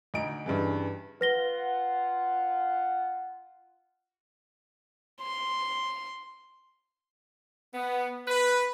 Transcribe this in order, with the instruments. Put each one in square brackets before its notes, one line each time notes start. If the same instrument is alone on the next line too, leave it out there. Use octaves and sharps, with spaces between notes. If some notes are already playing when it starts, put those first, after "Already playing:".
[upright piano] D2 D#4 D7
G2 C#3 E3
[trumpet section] F4 F#5 [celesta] B4 A#6 G7
[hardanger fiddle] C6
[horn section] B3
B4